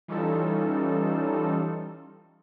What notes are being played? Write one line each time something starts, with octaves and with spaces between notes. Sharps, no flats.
E3 G3 C#4 D#4 F4 A4